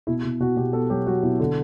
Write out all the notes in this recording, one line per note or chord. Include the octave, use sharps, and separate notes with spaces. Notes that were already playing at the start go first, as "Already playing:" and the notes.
B2 E4
B2
B2 F#4
B2 G4
B3 A4
F#3 G4
F#3 F#4
B2 E4
D3